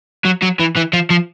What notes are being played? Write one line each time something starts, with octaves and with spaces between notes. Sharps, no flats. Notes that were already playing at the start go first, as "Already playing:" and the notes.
F#3
F#3
E3
E3
F3
F3